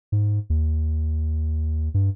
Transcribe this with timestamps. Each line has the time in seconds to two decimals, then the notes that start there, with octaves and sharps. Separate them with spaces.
0.12 G#2
0.50 D#2
1.94 G2